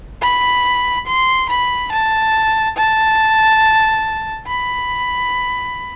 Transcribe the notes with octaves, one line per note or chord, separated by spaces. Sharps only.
B5
C6
B5
A5
A5
B5